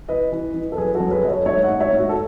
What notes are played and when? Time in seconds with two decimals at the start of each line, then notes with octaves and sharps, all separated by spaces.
0.09 E3 B4 D#5
0.32 E3
0.54 E3
0.72 A4
0.77 F#2 G#4 B4
0.95 F#4 A4
1.00 F#2
1.11 G#4 B4
1.23 F#2 D#5
1.29 A4 C#5
1.46 G#2 C#5 E5
1.63 D#5 F#5
1.69 G#2
1.80 C#5 E5
1.92 G#2
1.98 F#4
2.09 A4